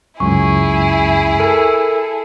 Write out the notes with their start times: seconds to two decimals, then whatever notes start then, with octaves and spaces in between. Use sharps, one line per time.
0.20 C#2 F#2 E4 G#4 C#6
1.40 A4 A#4